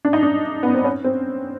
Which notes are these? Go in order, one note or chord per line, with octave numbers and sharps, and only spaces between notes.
D4
D#4
D4
B3
C4
C#4
C4